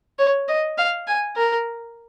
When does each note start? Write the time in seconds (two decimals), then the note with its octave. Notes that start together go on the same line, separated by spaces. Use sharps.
0.19 C#5
0.48 D#5
0.78 F5
1.07 G#5
1.36 A#4